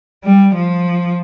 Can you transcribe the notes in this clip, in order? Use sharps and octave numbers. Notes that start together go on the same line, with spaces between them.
G3
F3